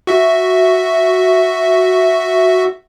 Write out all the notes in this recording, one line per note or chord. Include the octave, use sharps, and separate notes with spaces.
F#4 E5